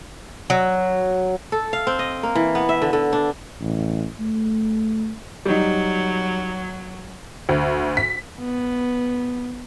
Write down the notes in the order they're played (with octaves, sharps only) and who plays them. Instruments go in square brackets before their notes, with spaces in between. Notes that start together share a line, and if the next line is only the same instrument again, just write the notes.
[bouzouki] F#3
[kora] A4
F5
C4
D#5
A#3
E3
B3
E5
D3
D3
D4
[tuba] A1
A3
[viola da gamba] F#3 [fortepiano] G3 D#4
[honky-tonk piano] D2
B6
[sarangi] B3